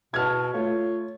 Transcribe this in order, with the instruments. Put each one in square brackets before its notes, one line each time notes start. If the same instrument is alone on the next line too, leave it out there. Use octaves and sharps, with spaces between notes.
[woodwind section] B2 [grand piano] A5 F6 G#6
[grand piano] A3 [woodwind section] F4 C#5